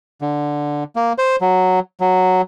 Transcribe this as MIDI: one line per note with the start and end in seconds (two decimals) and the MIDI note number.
0.21 0.84 50
0.96 1.13 58
1.18 1.36 72
1.41 1.80 54
2.00 2.42 54